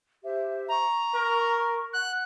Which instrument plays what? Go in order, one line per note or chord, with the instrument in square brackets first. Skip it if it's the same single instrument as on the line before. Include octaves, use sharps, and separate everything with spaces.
[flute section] G4 C5 E5
[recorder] A#5 [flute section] C#6
[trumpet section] A#4
[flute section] F#5 [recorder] F#6